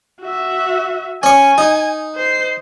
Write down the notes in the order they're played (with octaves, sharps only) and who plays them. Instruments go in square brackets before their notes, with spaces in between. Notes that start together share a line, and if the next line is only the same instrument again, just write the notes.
[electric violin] F#4 E5
[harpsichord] C#4 C#6 [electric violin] G#5
[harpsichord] D#4
[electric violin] C5 C7